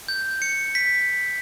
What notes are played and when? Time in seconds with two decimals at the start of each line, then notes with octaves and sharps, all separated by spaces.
0.08 G6
0.42 C#7
0.75 B6